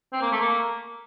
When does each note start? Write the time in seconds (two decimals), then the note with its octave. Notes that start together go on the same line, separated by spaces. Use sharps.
0.13 C4
0.22 A#3
0.32 A3
0.40 A#3